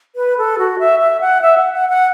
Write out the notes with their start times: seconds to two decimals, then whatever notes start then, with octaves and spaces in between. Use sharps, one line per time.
0.16 B4
0.38 A4
0.59 F#4
0.79 E5
1.00 E5
1.21 F#5
1.42 E5
1.58 F#5
1.74 F#5
1.89 F#5